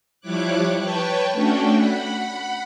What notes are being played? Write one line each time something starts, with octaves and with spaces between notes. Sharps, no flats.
F3 G3 E4 C#5 D6 F#6
B4 C#5 G5 A5 C#6
A3 C#4 D4 F#4 G5
F#5 B5